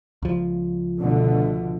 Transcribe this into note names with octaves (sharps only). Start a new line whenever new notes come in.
C#2 F3
B2 D3 A3